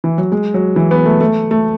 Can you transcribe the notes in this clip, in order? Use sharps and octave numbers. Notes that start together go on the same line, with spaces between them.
E3
F#3
G#3
F#3
E3
B3
A3
A3
A3